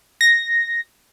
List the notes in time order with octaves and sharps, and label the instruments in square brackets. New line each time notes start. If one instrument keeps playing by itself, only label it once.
[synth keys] A#6